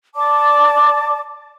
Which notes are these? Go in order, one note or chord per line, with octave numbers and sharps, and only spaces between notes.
D5 A5 D6